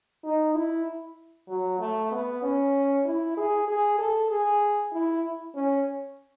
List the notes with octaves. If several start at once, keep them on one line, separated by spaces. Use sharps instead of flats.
D#4
E4
F#3
A3
B3
C#4
E4
G#4
G#4
A4
G#4
E4
C#4